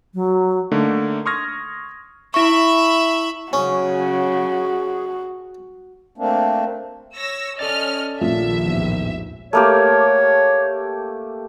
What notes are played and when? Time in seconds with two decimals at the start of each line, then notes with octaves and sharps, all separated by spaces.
0.14 F#3
0.71 D3 A3 A#3 D#4
1.26 C6 C#6 D#6 F6 G#6 A#6
2.34 E4 E5 B5 C#6
3.53 C#3 F#3 C#4 F#4 G#4
6.18 A3 A#3 C4 D4
7.17 C#5 E6 A#6
7.59 C#4 A4 D5 D#5 F6 A6
8.21 A#1 D#2 F3 E5
8.65 A1 E2 G#2
9.53 A3 A#3 G4 C#5